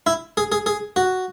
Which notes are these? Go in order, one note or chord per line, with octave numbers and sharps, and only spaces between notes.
E4
G#4
G#4
G#4
F#4